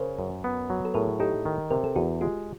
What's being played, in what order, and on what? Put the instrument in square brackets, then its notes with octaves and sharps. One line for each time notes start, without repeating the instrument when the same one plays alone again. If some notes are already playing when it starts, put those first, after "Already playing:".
Already playing: [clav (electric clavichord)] C#3 [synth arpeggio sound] A#4 C5
[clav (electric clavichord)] F#2
B3
F#3
[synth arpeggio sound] A4
[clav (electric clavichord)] A2 [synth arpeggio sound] G#4 A#4
[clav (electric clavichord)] D#4 [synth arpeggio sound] G4 A4
[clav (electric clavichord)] D#3
[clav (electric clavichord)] C3 [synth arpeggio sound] A#4
[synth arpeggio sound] A4
[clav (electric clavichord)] E2 [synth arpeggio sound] F#4 G#4
[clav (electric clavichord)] G#3 [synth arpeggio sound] F4 G4